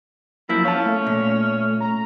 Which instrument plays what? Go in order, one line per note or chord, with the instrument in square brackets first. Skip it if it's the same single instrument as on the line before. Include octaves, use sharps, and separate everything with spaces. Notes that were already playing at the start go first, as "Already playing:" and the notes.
[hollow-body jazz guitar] F#2 F3 A#3 [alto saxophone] E4
[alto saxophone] C#4 [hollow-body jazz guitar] F5 A5
[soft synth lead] A3
[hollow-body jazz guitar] A#2
[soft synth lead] A#5